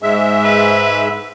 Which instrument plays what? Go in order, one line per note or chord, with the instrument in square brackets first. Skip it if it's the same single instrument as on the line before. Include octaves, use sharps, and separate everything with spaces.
[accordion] G#2 G#3 E5
[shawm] B4